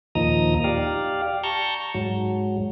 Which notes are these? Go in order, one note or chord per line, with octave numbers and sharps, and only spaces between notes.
D#2 A#2 F3 D#4 A#5 D#6
G4 D5 F5
A5 A#5 C#6 G6
G#2 F#3